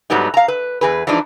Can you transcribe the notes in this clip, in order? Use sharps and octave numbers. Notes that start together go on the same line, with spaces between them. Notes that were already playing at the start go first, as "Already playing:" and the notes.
G#2 F#3 G3 A3 B3 D#4
F5 A#5
B4
E2 G#4 B4
E3 F3 G#3 D4 D#4